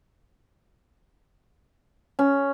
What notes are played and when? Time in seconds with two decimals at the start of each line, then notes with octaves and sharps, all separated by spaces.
2.19 C#4